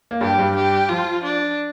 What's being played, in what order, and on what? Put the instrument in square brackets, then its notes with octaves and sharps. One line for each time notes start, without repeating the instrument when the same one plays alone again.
[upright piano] A#3
[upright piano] G2 G3 [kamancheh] G4
[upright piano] G2 G3
[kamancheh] G4
[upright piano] F3 [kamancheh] F4
[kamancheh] D4